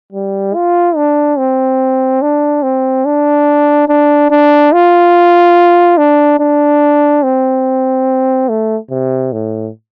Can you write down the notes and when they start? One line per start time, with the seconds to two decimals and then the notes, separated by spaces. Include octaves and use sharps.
0.12 G3
0.54 F4
0.96 D4
1.38 C4
2.22 D4
2.63 C4
3.05 D4
3.88 D4
4.30 D4
4.72 F4
5.97 D4
6.40 D4
7.23 C4
8.49 A3
8.90 C3
9.32 A2